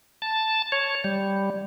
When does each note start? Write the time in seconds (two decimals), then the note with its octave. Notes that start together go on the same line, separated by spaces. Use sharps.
0.22 A5
0.72 C#5
1.04 G3